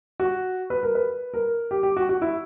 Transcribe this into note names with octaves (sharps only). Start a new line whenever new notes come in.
F#4
B4
A#4
B4
A#4
G4
G4
F#4
F#4
E4